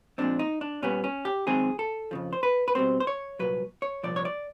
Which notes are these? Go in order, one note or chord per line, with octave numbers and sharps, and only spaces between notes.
A#2 F3 G#3 C4 D4
D#4
D4
A#2 G3 B3 C#4
C#4
G4
F#2 D#3 G#3 C4 G#4
A4
F2 C#3 F3
C5
B4
B4
B2 G3 C4 C5
C5
C#5
C2 A#2 F#3 B4
C#5
C2 A#2 F3 D5
C#5
D5